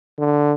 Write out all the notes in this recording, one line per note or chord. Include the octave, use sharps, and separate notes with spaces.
D3